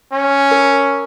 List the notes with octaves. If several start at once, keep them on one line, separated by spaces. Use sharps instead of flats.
C#4
A#4